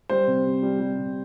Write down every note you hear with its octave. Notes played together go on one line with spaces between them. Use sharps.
G3 C5
C3
C3
G3
G3
C3